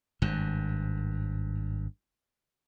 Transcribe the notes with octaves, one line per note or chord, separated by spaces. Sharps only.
G#1 G2